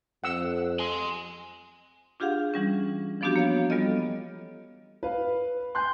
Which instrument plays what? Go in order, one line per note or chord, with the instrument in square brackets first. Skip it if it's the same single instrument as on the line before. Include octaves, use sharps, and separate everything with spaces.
[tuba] F2 [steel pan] F#5 E6
[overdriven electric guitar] G#5 C6
[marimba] D4 F4 G4 G#4 F5 F#5
E3 G3 C#4
E3 F3 B3 D4 F#4 G4
A#3 C#5 F5
G3 B3 F4 A4 D#5
[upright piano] B4 F5
[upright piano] G5 G#5 [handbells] C6 F#6 G6